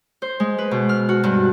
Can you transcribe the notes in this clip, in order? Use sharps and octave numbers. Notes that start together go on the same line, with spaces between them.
C5
G#3
B4
B2
F6
F#4
G2